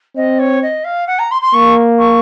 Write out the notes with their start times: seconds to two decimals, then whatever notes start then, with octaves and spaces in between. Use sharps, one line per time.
0.16 C4 D#5
0.39 C#5
0.63 D#5
0.84 F5
1.07 F#5
1.19 A#5
1.31 C6
1.42 C6
1.54 A#3 C#6
1.99 C#6